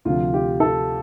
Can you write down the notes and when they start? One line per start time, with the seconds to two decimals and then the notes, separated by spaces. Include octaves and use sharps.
0.05 D2 C3 F3 F4
0.33 G4
0.60 A4